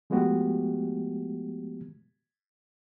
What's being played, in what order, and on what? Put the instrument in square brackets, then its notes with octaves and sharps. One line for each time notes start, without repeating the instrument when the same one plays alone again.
[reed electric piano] F3 G#3 A3 B3 F#4 G4